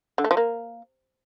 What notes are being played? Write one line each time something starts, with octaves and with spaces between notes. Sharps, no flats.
D3
A3
F3
A#3